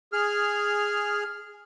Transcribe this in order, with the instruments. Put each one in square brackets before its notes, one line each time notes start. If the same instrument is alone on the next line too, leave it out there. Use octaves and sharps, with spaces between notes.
[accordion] G#4 F6